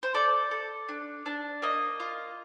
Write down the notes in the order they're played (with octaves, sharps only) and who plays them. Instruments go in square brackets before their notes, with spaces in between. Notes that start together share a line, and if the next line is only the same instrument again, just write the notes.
[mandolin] C5
A4 D5
A4
D4
D4
A#3 D#5
F4